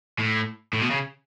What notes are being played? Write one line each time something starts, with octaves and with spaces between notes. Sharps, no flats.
A2
A2
B2
C#3